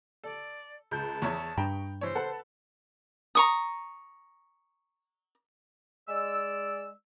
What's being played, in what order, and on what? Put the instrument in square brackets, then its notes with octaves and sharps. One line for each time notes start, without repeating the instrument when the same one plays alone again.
[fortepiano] A4 [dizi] D5
[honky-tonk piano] C#2 G6 [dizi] A5
[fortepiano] E2 E4 C#5 [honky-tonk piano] C#6 D#6
[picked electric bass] G2 D4 [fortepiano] G5 A#5 B5
[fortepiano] E3 C#5 [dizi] C5
[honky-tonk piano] A4 B4 A5 [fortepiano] F#5
[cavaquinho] A#5 C#6 D#6
[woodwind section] G#3 D5 E6